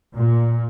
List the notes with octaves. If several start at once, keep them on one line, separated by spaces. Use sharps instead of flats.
A#2